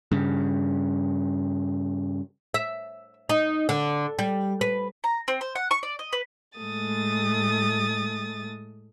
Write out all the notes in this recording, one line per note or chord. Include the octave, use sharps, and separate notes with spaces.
G2 C#3
E5
D#4
D3
G3
B4
A#5
C4
C5
F#5
C#6
D5
D#5
B4
A2 G#3 A3 D#6 A6